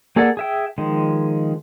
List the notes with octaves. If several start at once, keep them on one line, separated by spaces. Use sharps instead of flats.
A#3 G#4 A4 D5 F#5
G#4 E5 G5
D#3 F3 G#3